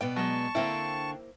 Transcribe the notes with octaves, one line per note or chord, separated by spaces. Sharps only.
B2 B3 D5 G5
F#3 G#3 A5 C#6
D3 A#3 C4 E4 F5 G5